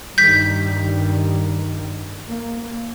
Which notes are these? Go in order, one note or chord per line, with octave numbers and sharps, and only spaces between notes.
G2 D#3 G3 G6 B6
A#3